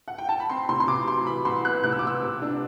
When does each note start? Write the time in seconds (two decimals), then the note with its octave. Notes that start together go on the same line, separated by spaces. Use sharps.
0.08 F#5
0.18 G5
0.29 A5
0.40 B5
0.50 C4 C6
0.69 C3 C6
0.80 C6
0.88 C3 D6
1.08 F#3 C6
1.26 E3 B5
1.45 C2 C6
1.65 B3 F#6
1.84 C3 F#6
1.92 E6
1.99 D6
2.04 B3 E6
2.22 C3
2.42 D4